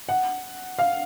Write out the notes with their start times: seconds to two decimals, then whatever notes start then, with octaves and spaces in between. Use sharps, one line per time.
0.09 F#5
0.79 F5